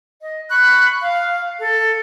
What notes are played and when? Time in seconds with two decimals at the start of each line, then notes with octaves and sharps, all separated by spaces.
0.21 D#5
0.49 B5 C#6 F#6
1.01 F5
1.59 A4